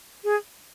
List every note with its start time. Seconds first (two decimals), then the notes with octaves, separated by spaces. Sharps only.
0.24 G#4